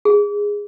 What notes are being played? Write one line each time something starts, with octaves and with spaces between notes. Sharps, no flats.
G#4